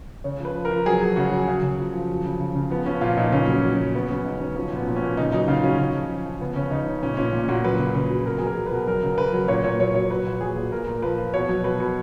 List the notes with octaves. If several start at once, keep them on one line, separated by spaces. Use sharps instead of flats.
C#3 C#5
F3 B4
F3
A#4
F3
F#3 G#4
F#3
C#3 F#4
F#3
C#3
C#3
F3
F3
F#3
C#3
C#3
C#3
F3 B3
F3 C#4
A#2 F4
A#2 D#4
C#3 C#4
F#3
C#4
F#3
F#3 C#4
C#3 B3
F#3 C#4
C#3 D#4
F#3 C#4
F3 C#4
A#2
B3
A#2
C#4
A#2
C#3 D#4
F#3 D#4
C#3 F4
F#3 C#4
C#3 C#4
F3
F3
F3
C#3 B3
C#3 C#4
C#3 D#4
C#3
A#2 C#4
A#2 C#4
A#2
A#2 F#4
F#3 B4
C#3
C#3 B4
F#3
B2 A#4
F#3 G#4
A#4
F#3
B2 B4
F#3 A#4
C#3
C#3 B4
F#3
A#2 C#5
A#2 C#5
F#3 C#5
F#3 C#5
F#3 B4
A#2
F#3 G#4
A#2
A#2 A#4
A#2
F3 B4
F3
B2 C#5
F#3
B2 B4
B2